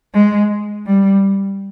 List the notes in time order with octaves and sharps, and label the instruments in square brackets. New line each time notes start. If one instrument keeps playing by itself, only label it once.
[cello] G#3
G3